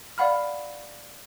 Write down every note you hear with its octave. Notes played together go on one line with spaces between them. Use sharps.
D5 F5 F#5 B5 F6